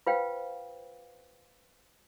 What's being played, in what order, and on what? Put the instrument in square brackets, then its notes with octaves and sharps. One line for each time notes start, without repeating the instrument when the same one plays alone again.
[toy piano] F4 B4 C5 F5 G5